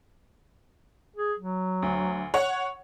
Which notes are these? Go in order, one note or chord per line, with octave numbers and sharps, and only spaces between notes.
G#4
F#3
D2
C#5 F#5 C#6